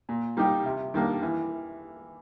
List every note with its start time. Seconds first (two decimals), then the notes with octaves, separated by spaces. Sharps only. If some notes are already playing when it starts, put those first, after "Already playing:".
0.09 A#2
0.37 G3 A#3 D#4 G4
0.66 C3
0.94 D#3 G3 A#3 D4
1.23 E3